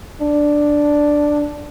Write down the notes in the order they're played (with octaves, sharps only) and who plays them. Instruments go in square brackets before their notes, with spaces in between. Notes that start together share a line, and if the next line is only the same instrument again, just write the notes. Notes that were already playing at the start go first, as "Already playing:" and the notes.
[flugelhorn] D4